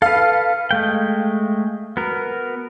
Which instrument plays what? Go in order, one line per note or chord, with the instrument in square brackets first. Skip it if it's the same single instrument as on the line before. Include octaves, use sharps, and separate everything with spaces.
[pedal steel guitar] A4 B4 [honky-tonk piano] F5
[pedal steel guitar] G#3 A3 G5
B3 F#4 A#4